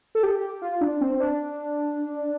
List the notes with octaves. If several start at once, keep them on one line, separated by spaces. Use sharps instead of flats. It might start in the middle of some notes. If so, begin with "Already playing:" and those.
A4
G4
F4
D4
C4
D4